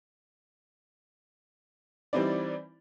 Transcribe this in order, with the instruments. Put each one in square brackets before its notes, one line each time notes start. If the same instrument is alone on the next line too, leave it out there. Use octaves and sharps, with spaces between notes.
[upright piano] E3 G3 C4 D#4 E4 D5